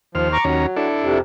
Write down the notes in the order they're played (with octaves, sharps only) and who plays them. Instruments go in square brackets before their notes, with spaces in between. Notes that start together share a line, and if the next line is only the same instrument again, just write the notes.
[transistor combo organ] D#2 C5 F6 [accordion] F3
[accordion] A#5 C#6 D6
[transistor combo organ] D#2 C#4 A#5 [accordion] F#3
[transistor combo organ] D4 E4 A4
[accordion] F2 C3